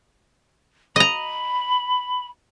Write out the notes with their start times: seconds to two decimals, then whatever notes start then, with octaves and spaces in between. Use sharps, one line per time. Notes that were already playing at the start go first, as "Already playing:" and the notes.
0.96 D#5 A#5 B5